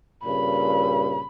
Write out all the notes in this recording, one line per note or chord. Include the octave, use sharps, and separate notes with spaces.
G2 A#2 C#3 B5